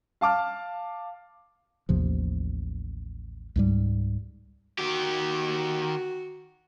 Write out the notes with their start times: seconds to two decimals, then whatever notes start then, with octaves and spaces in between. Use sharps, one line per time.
0.21 F5 A5 D6 F6
1.89 A1 D#2 C3 F3
3.56 C#2 G#2 G3
4.79 D#3 F#4 G4